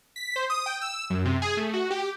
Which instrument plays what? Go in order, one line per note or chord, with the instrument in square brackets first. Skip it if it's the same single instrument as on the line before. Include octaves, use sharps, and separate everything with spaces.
[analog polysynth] B6
C5
D#6
G5
E6
F#2
C3
G#4
A3
F#4
G4